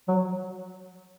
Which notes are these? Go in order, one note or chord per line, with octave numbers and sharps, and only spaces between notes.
F#3